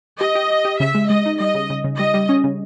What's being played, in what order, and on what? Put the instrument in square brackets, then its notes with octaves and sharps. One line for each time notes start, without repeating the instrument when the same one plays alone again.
[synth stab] G4 [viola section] D#5
[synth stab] G4
G4
G4
[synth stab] C#3 [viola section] E5
[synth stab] G#3
[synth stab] G#3 [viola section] D#5
[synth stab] D#4
[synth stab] G3 [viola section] D#5
[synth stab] C#3
C#3
C#3
[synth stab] G3 [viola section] D#5
[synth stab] G3
C#4
C#3